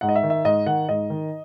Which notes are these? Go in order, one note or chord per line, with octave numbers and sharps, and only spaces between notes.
G#2 F#5
D#5
E5
D#3
E5
G#2 D#5
D#3 F#5
G#2 D#5
D#3